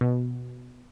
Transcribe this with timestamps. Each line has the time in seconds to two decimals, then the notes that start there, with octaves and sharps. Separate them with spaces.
0.01 B2